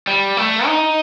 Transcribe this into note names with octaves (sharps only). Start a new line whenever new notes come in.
G3
A3
D#4